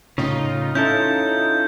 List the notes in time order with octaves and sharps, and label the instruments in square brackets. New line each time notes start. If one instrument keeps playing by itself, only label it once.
[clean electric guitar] A2 C#3 [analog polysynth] D#4 F4
[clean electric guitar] C#4 E4 A4 [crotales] G6